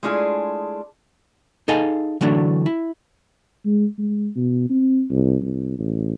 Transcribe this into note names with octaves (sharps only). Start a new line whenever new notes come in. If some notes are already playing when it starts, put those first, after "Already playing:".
G#3 A3 D4 E4 F4 G#4
D#4 G#4 A4 D#5 F5 G#5
D3 E3 F#3 A3 D4
E4
G#3
G#3
B2
C4
C2
C2
A1